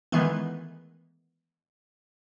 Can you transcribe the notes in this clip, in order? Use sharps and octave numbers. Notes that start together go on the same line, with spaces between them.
D#3 E3 G#3 A3 B3